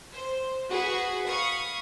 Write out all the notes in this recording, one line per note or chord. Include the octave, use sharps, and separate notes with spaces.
C5
F#4 G#4 B4
F5 B5 C#6 D#6